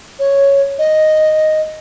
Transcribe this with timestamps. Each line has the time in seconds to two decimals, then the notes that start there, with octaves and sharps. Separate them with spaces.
0.19 C#5
0.79 D#5